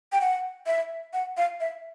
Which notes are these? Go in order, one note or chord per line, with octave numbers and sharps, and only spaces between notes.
G5
F#5
E5
F#5
F5
E5